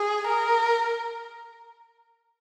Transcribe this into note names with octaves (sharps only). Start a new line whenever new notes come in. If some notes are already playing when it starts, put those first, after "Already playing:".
Already playing: G#4
A#4